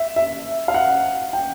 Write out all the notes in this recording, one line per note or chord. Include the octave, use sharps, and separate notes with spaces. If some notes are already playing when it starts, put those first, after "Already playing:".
Already playing: E5
E5
F5
F#5
G5